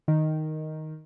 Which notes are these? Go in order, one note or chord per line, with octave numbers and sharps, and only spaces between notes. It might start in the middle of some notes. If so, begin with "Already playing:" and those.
D#3